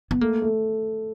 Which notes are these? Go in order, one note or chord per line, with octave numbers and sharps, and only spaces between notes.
B3
A3 A#3
A3